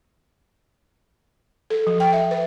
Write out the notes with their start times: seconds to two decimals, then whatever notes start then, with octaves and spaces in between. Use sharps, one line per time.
1.70 A4
1.87 F3
2.00 G5
2.13 E5
2.31 B4